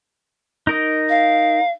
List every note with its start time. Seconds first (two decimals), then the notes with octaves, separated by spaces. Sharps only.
0.67 D#4 A#4 D#5
1.09 F5